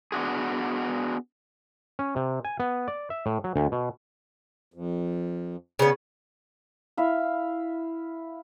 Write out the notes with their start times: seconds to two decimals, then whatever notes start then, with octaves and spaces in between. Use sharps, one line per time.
0.12 B3 D4 F#4 G#4
1.99 C#4
2.16 C3
2.45 G#5
2.60 B3
2.88 D5
3.10 E5
3.26 A2
3.44 F#3
3.56 D2
3.72 B2
4.74 F2
5.79 C#3 B3
6.97 E4 E5 F5